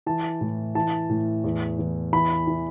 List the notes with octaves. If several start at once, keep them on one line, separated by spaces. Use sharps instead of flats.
E3 A5
A2
E3 A5
A2
E2
E2
E3 B5
E3